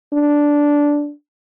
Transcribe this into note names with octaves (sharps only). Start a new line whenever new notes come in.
D4